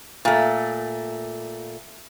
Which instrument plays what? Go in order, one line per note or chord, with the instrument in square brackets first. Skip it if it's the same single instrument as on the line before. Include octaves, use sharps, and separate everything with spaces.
[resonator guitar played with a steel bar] A#2 A3